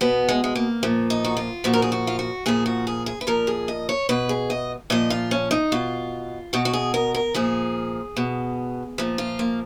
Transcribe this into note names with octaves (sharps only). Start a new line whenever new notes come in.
B2 B3
G#3
G#3
A#3
A#2 F3
D#4
F#4
F4
A#2 F3 F#4
A#4
G#4
F#4
F4
F#4
A#2 F3 G#4
F#4
G#4
G#4
B4
A#2 F3 A#4
G#4
D#5
C#5
B2 B4
G#4
D#5
A#2 F3 D#5
F4
C#4
D#4
B2 F4
B2 F#4
F#4
G#4
A#4
A#4
A#2 F3 G#4
B2
A#2 F3
F4
A#3